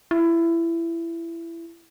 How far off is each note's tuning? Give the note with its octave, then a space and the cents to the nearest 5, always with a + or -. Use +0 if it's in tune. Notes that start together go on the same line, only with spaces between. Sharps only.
E4 +20